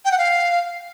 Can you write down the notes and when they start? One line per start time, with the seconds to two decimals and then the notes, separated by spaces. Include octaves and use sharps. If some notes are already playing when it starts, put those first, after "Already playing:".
0.05 G5
0.12 F#5
0.18 F5